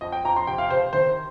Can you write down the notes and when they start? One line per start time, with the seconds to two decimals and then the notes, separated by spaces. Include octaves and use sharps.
0.01 F2 D#5
0.12 G5
0.25 F2 A#5
0.36 C6
0.47 C3 G5
0.58 F5
0.70 C3 C5
0.93 D#3 C5